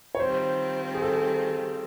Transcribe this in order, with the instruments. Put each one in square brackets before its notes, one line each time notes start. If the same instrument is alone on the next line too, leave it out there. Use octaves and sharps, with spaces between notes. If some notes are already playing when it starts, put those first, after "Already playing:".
[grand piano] C#5
[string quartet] D#3 G3 C4 F4 [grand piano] C5
[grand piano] G#4
A4